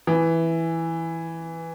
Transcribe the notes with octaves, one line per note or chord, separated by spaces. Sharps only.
E3